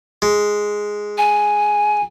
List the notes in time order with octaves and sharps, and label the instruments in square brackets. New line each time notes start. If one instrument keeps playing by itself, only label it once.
[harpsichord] G#3
[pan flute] G#5